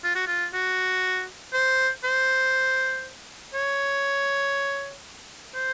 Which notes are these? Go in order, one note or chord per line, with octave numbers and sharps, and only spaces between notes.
F4
F#4
F4
F#4
C5
C5
C#5
C5